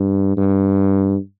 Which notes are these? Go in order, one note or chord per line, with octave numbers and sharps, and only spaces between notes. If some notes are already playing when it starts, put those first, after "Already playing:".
Already playing: G2
G2